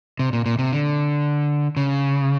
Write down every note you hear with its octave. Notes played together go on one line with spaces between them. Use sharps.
C3
A#2
A#2
C3
D3
C#3